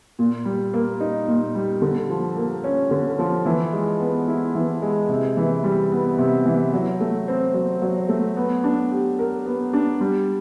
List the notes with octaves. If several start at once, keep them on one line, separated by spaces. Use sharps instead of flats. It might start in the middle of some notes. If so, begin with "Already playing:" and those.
A#2
G3
A#3
D#4
A#2
G3
D3
F3
A#3
C#4
D3
F3
E3
G#3
B3
E4
E3
G#3
C3
E3
G3
B3
C3
E3
F#3
A3
C4
F#3
F#3
A3
B3
D4
G4
A#4
B3
D4
G3